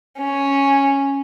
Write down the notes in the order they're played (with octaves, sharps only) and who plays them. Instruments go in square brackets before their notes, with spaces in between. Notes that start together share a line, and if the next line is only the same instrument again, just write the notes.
[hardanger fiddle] C#4